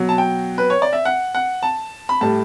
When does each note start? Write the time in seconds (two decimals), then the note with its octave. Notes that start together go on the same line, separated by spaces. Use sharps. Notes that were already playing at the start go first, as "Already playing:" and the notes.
Already playing: B2 F#3
0.09 A5
0.18 G5
0.58 B4
0.70 C#5
0.82 D5
0.93 E5
1.05 F#5
1.35 F#5
1.63 A5
2.09 B5
2.21 A2 G3 A5